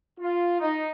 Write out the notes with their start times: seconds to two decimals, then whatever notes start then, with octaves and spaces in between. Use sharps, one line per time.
0.20 F4
0.60 D#4